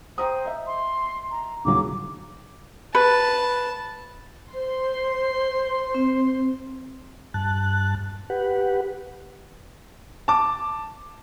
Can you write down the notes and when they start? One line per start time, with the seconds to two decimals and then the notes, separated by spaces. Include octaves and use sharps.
0.18 C5 G5 A#5 D#6
0.45 D#5 E5
0.67 C6
1.31 A#5
1.65 D#2 C#3 F#3 D6
2.95 B4 A5
4.54 C5 C6
5.94 C4
7.34 G2 A5 F#6
8.30 G4 B4 F#5
10.28 A5 D6